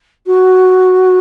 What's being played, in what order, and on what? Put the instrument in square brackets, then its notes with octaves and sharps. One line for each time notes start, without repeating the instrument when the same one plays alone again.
[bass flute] F#4